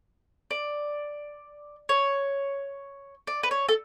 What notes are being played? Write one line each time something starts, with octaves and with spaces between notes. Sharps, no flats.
D5
C#5
D5
B4
C#5
A4